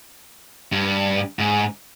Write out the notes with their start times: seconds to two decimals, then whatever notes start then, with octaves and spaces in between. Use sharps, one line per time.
0.72 G2
1.39 G#2